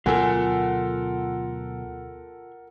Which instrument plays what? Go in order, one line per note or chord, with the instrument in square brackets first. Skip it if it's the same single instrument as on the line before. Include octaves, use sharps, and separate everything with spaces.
[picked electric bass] D2 B2 F#3 [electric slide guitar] F4 G#5 [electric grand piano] A4 A#4 F#5